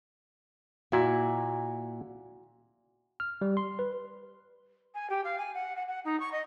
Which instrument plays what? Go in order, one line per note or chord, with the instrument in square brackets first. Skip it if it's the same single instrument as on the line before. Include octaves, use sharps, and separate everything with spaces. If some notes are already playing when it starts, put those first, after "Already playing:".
[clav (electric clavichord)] A#2 E4 [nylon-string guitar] F#4
[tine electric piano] F6
G3
C6
B4
[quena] G#5
G4
F5
G#5
F#5
F#5
F#5
D#4
C#6
D#5